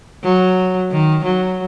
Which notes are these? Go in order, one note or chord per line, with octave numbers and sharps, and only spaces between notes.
F#3
D#3
F#3